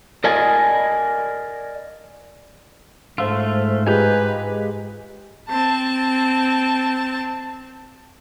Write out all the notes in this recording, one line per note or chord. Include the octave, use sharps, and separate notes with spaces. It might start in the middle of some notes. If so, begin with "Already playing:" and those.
A#4 D5 D#5 F5 G#5 A5
G#2 A3 F4 C5 F5 E6
G#3 F4 G4 B4 G#5 A#5 G6
C4 A5